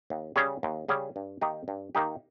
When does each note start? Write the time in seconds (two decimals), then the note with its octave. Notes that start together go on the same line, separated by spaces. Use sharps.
0.10 D#2
0.36 C#3 G3 C#4 G#4
0.63 D#2
0.89 C#3 G3 C#4 G#4
1.16 G2
1.41 D#3 A#3 D#4 G4
1.68 G2
1.95 D#3 A#3 D#4 G4